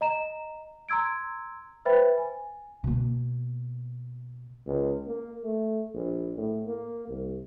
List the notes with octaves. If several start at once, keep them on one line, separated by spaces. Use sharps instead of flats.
D#5 A#5 E7
A#5 C6 E6 G#6 D7
B4 C5 E5 G5 B5 A6
G#5
B2 A#3
C#2
A#3
A3
A#1
A2
A#3
C2